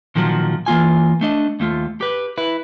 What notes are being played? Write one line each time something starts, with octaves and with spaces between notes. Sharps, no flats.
A#2 D#3 F3 F#3
E3 A#3 F4 G#5
A3 D4 D#5
D#2 A3 F4
G4 B4
E4 B4